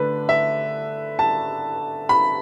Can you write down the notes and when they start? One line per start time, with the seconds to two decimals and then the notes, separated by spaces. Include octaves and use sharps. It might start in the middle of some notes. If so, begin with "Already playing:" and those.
Already playing: D3 A3 D4 B4
0.29 E5
1.19 A5
2.09 B5